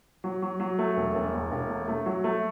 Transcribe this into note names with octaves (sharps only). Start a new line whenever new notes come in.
F#3
F#3
F#3
A3
E1
E1
E2
E1
A3
A3
F#3
A3